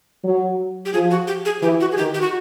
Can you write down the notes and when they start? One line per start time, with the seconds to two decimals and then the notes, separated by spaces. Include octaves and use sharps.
0.24 F#3
0.86 G4
0.93 F3 G#4
1.11 F#4
1.28 G4
1.45 G#4
1.62 E3 G4
1.80 F#4
1.92 G#4
1.97 D#3 G4
2.14 G4
2.21 F#4